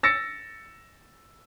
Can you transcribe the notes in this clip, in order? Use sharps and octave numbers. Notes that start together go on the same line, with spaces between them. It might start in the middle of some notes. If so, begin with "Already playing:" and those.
E6 A6 A#6 C#7